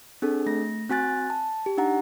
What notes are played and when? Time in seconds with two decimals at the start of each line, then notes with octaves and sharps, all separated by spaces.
0.22 C4 D4 G#4 A4
0.46 A3 A#6
0.90 C4 F#4 G#5 F#6 A6
1.30 A5
1.66 G4
1.77 D4 D#4 F#5 A#5